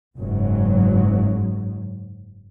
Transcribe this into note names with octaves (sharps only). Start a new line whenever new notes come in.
F#1 G#2 F#3